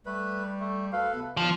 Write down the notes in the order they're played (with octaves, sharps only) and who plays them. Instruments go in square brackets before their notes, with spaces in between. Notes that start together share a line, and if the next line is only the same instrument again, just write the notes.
[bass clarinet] G3 [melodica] A3 B4
[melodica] A3
[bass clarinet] D2 [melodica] A4 B4 [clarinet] F5
[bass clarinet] C3 [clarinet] B3
[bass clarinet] D#3 [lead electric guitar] F3 [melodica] D4